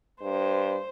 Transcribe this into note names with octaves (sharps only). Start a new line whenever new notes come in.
G2 C5